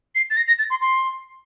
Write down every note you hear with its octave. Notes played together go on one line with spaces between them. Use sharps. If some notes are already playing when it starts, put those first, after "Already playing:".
C7
A6
A#6
A#6
A6
C6
C6